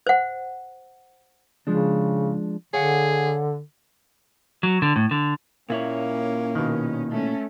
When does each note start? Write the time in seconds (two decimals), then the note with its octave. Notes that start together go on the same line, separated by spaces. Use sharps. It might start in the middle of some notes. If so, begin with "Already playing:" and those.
0.07 C5 F#5
1.67 C#3 F3 G#3 D4
2.74 D3 G#4 C#5 F5 F#5
4.63 F#3
4.82 D3
4.96 A2
5.11 D3
5.70 A#2 A#3 C#4 E4 C#5
6.55 B2 D#3
7.10 A3 C#4